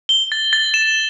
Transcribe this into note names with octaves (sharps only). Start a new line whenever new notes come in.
G7
A6
A6
E7